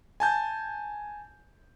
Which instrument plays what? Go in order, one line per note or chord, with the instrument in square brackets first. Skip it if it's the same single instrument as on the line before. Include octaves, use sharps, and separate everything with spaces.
[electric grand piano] G#5 A5 G6